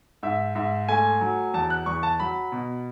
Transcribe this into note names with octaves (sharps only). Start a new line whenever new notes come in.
G#2 E5
G#2 E5
A3 G#5
F#3
E2 A5
F#6
E2 C#6
A5
F#3 B5
B2